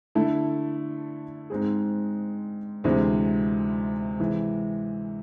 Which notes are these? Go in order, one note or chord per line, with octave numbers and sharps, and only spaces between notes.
D3 A3 E4 A4
G#2 G#3 C4 G#4
D2 C3 E3 G#3
C3 E3 G#3